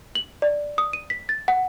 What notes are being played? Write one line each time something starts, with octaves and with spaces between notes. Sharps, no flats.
F#7
D5
D#6
D#7
B6
A6
F#5